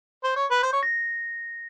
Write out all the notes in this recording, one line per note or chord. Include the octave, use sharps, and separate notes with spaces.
C5
C#5
B4
C5
C#5
A#6